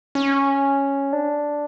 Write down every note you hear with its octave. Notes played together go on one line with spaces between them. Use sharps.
C#4
D4